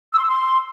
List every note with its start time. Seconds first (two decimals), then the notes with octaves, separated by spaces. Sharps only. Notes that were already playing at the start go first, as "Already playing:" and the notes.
0.12 E6
0.17 C6
0.23 E6
0.28 C6